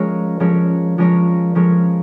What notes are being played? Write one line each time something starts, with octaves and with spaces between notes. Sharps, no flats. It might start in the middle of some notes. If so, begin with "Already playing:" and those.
Already playing: F3 G#3 C#4 A#4 C#5
F3 G#3 C#4 A#4 C#5
F3 G#3 C#4 A#4 C#5
F3 G#3 C#4 A#4 C#5